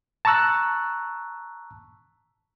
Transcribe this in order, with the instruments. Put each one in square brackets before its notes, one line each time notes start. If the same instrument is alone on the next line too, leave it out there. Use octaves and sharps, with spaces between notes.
[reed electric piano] A5 A#5 C#6 E6 F#6